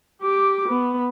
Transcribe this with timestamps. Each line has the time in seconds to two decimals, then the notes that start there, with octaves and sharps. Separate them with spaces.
0.22 G4 D6
0.69 B3